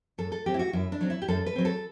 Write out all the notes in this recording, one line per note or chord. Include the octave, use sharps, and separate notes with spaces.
F#2 A4
A4
F#3 C4 G4
E4
F#4
F#2 E4
D4
F#3 C4
E4
G4
F#2 A4
B4
F#3 C4
A4